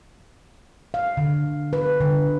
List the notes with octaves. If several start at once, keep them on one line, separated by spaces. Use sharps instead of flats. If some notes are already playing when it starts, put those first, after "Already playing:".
F5
D3
B4
D3